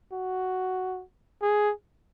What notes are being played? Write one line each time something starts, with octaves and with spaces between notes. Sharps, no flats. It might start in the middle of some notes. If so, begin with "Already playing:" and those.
F#4
G#4